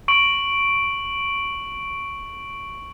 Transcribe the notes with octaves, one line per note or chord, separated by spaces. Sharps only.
C#6 D7 F#7